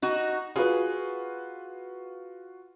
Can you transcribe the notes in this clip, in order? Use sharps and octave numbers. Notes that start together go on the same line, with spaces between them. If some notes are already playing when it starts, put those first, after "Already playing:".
D#4 F#4
F4 F#4 G#4 B4